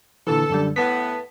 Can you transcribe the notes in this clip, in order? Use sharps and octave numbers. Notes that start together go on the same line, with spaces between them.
A#2 D3 E3 A4
F#2 D3 G3
A2 B3 A5 B6